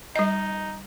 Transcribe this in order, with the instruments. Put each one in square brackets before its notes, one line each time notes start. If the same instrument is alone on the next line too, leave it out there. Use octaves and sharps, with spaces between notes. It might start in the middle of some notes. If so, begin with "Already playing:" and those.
[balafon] G3 D#5 [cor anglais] D#4